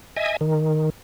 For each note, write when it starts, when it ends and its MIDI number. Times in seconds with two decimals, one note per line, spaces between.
0.17 0.37 75
0.17 0.37 76
0.17 0.37 80
0.41 0.90 51